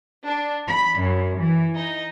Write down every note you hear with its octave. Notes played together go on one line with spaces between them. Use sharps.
D4
B5
F#2
E3
D#4